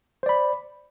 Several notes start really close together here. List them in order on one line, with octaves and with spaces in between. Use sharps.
C5 D5 B5